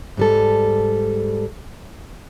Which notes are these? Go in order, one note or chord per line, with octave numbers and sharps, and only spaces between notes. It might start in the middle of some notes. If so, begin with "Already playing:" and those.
G#2 G3 A4